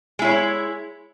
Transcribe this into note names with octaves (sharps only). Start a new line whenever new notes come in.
G#3 E4 C#5